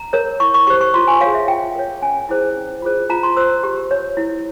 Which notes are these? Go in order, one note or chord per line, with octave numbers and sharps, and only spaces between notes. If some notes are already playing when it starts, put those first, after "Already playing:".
Already playing: A#5
A#4 C#5
E4 C#6
C#6
G4 C5 C#6
C#6
F4 C6
G#5
G#4 C#5 F5
E5
F4 G5
A#4 C#5
C#4 G#5
E4 G#4 C5
C#4
F4 G#4 C5
F4 A#5
C6
C5 E6
G4
C#5
E4